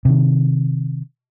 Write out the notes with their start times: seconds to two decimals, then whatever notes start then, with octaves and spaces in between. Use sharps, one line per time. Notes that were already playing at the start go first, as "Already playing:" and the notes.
0.05 C3 D#3